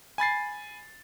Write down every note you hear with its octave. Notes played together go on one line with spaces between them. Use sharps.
G#5 B5 A6 C7